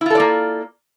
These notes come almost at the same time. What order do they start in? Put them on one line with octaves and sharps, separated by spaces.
E4 F4 A4 D5 A#3